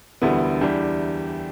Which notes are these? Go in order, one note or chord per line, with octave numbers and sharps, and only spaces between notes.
E1 D2 D3 G3 B3 E4
E2 E3 G3 D4 G4